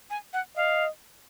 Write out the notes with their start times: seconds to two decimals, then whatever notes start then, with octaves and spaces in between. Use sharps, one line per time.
0.10 G#5
0.33 F#5
0.56 D#5 F5